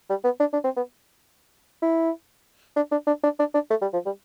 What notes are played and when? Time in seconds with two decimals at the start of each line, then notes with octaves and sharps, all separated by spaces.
0.10 G3
0.24 B3
0.40 D4
0.53 D4
0.64 C4
0.77 B3
1.82 E4
2.76 D4
2.91 D4
3.07 D4
3.23 D4
3.39 D4
3.54 D4
3.70 A3
3.82 G3
3.93 F3
4.06 G3